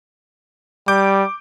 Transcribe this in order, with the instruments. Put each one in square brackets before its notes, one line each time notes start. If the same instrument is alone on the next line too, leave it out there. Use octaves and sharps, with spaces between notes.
[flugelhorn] G3 [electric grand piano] D6 G6 D7